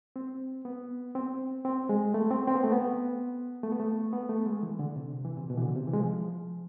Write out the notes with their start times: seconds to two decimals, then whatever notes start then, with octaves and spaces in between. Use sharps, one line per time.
0.16 C4
0.65 B3
1.15 C4
1.65 C4
1.89 G#3
2.14 A3
2.31 C4
2.47 C4
2.56 B3
2.64 A3
2.72 B3
3.63 A3
3.72 B3
3.80 A3
4.13 B3
4.29 A3
4.46 G#3
4.63 E3
4.79 D3
4.96 C3
5.25 E3
5.37 C3
5.50 B2
5.57 E3
5.62 D3
5.75 C3
5.87 E3
5.93 G#3
6.00 F3